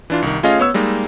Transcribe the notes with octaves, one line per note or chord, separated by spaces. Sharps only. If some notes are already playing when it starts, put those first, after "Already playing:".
E3 D4 F4
C2 D#3
A3 C#4 F4 G#4 D#5 F5
B3 C#5 E6
G3 G#3 A#3 D#4